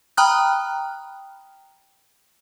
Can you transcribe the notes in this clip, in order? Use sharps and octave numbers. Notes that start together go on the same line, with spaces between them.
G5 A#5 B5 D#6 F6 F#6